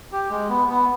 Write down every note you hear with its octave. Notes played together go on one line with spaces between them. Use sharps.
G4
G#3
B3
B3